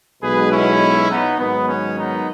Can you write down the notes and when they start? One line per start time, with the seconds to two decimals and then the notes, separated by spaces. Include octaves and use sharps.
0.21 B1 B2 G#3 B3 G#4 B4
0.49 C#4 E4
1.09 B3 D#4
1.37 G#2 D#3 F#3 B3
1.68 C#4
1.96 B3 D#4